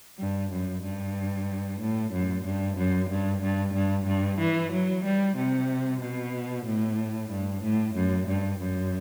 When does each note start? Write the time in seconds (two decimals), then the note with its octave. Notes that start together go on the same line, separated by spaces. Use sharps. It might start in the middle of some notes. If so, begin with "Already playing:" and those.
0.19 G2
0.51 F#2
0.83 G2
1.81 A2
2.13 F#2
2.45 G2
2.78 F#2
3.10 G2
3.42 G2
3.74 G2
4.07 G2
4.39 E3
4.72 F#3
5.04 G3
5.36 C3
6.01 B2
6.66 A2
7.31 G2
7.63 A2
7.95 F#2
8.28 G2
8.60 F#2